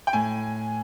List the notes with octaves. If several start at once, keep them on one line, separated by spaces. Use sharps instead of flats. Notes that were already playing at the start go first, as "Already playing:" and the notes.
G5
A2 G#5